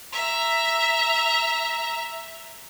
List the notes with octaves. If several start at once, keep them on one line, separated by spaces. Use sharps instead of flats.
E5 A#5